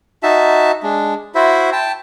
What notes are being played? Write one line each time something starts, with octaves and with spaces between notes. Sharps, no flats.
D#4 F#4 E5 A5
G#3 D4
E4 F#4 C5 E5
G5 A5